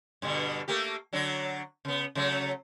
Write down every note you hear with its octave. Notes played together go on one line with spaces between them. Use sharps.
G2 B2 D3
A3 A#3 G4
D3 F#3 D4
C#3 B3
C#3 F#3 A3